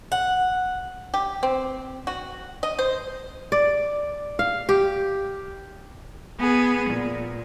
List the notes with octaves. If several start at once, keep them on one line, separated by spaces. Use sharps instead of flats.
F#5
G4
C4
F#4
D#5
C5
D5
F5
G4
B3 G#4
A#2